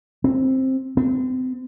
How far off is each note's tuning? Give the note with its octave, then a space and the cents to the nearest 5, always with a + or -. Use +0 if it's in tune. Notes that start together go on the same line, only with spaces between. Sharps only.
C4 +10
C4 -35